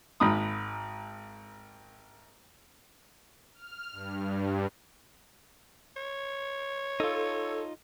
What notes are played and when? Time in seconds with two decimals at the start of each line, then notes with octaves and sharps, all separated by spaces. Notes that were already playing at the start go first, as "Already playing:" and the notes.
0.20 G#1 G#2 B5 D#6
3.54 F6
3.92 G2
5.96 C#5
7.00 D#4 F4 A4